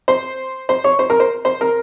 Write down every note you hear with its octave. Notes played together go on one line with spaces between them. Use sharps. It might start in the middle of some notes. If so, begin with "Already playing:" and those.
C5
C5
C#5
C5
A#4
C5
C5
A#4